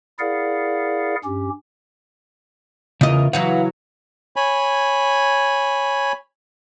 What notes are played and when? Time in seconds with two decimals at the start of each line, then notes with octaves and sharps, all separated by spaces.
0.19 E4 G#4 A#4 D5 F5 F#5
1.24 G2 C#4 G4
3.01 E2 C#3 F4 A#4 D#5
3.33 C#3 E3 F#3 B4 F5 F#5
4.36 C#5 G#5 B5